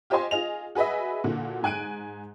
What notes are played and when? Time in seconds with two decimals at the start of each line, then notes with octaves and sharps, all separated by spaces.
0.10 F4 G4 C5 D#5 G#5 C6
0.31 F4 G#4 D#5 F7
0.75 F#4 G#4 B4 D#5 E5
1.24 A#2 D3 E3 F#4
1.63 G#2 G#5 F#6 D7 D#7